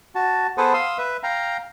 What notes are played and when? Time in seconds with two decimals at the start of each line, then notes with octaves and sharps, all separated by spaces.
0.15 F#4 A5
0.58 B3 G#4 A4 B4 C5 F#5
0.74 F5 C6 D#6 E6
0.98 B4 E5
1.23 F5 G5 A#5